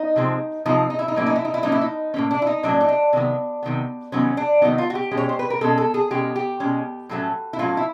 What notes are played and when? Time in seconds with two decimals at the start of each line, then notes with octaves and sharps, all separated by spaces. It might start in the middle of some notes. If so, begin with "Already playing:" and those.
Already playing: D#4
0.16 C3 F3 G#3 C4
0.65 C3 F3 G#3 C4 D#4
0.90 D#4
0.99 E4
1.08 D#4
1.15 A2 F#3 A#3 C#4 E4
1.26 D#4
1.36 E4
1.45 D#4
1.54 E4
1.63 A2 F#3 A#3 C#4 D#4
1.72 E4
1.81 D#4
2.14 A2 F#3 A#3 C#4
2.31 D4
2.42 E4
2.47 D#4
2.63 A2 F#3 A#3 C#4 D4
2.81 D#4
2.88 D4
3.13 C3 D#3 F#3 B3
3.63 C3 D#3 F#3 B3
4.12 C3 D#3 F#3 B3 C#4
4.37 D4
4.62 C3 D#3 F#3 B3 D#4
4.78 F4
4.90 F#4
4.95 G4
5.11 B2 G#3 C#4
5.17 C#5
5.29 C5
5.39 B4
5.50 A#4
5.61 B2 G#3 C#4 A4
5.78 A4
5.94 G#4
6.10 B2 G#3 C#4 G4
6.36 G4
6.60 B2 G#3 C#4
7.09 A2 F#3 A3 C#4
7.53 E4
7.59 A2 F#3 A3 C#4 F4
7.77 E4